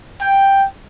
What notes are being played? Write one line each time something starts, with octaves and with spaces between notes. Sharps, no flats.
G5